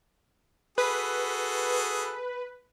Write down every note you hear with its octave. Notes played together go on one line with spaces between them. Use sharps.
F#4 G#4 A4 B4